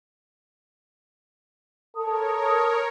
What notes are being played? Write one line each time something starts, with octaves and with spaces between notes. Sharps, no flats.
A4 A#4 C#5 D#6